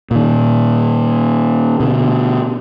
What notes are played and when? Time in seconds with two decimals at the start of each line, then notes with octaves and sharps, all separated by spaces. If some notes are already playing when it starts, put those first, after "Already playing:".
0.11 A#2 D#3
1.80 B2 D3